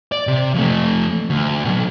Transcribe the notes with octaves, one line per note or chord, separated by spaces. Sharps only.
D5
C3
F2 A3
D2
B2 F#3